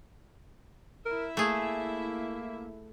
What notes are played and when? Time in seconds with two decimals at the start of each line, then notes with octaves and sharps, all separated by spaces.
1.05 E4 A#4 E5
1.37 A3 A#3 G#4